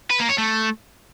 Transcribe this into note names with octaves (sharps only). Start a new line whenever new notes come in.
B4
A#3
C#5
A3